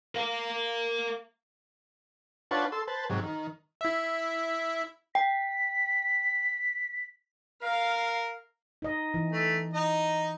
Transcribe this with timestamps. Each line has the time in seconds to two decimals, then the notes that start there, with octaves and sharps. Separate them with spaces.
0.15 A#4 F5
2.51 D4 F4 B4 C#5 F#5 A5
2.72 A4 C6 E6
2.88 B4 C5 A5
3.10 G#2 C3 F#3
3.23 D#3
3.81 E4 E5
5.15 G5 B6
7.63 A#4 F5 F6
8.82 D#4 D#5
9.14 E3
9.32 A3
9.74 D#4 D#5